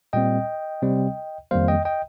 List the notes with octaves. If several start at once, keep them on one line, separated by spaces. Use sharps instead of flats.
A#2 G3 C4 D#5 G5
C3 G3 C4
F2 D#3 G3 A#3 C5 F5
D#5 G5
D#5 G5